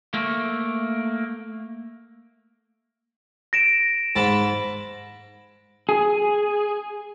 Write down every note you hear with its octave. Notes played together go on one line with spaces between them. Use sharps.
A3 A#3
A#6 D7 E7
G#2 A5 B5
G#4